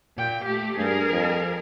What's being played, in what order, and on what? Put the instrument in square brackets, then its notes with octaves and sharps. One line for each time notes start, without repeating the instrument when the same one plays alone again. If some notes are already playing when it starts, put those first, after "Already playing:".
[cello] A#2 G5
A3 G4
[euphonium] G2 [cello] G#4 A#4
[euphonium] F2